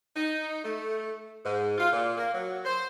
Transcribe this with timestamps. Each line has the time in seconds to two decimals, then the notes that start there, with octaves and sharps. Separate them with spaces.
0.15 D#4
0.64 A3
1.45 G#2
1.78 F4
1.92 A#2
2.17 A#3
2.33 F#3
2.64 C5